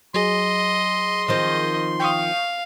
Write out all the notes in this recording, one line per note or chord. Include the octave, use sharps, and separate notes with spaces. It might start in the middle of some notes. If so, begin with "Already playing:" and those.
F#3 G#4 D#5 C6
D#3 F3 C4 D#5
F5 G5 C#6 D#6